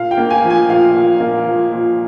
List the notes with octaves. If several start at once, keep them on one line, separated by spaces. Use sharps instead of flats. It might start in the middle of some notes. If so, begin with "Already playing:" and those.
Already playing: A#2 F5
G5
A#3
G#5
F3
G#5
A#2 F5
A#2
A#3
F3
A#2